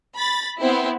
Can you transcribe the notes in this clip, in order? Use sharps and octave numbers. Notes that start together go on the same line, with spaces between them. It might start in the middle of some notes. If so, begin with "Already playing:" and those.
B5 A6
B3 C4 E4